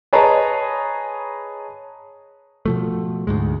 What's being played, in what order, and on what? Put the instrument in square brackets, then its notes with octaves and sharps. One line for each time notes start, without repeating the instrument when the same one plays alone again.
[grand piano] G#4 B4 C#5 D#5 A5 A#5
[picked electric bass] B2 F3 A3
D2 G#2 G#3